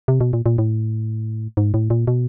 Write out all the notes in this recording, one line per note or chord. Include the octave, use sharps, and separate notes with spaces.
C3
B2
A#2
A#2
A2
G#2
A2
A#2
B2